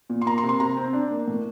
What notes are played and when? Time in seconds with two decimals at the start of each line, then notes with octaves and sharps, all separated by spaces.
0.10 A#2
0.21 C6
0.26 A#3 A#5
0.38 C6
0.43 C3
0.49 C6
0.60 C3 A#5
0.77 C4
0.93 D4
1.11 A#3
1.27 A2